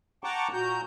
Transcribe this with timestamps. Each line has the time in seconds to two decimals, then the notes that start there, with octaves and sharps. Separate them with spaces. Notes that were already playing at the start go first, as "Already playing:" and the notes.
0.24 F#5 G5 A5 A#5 C#6 D6
0.53 A#2 F#4 A#5 G6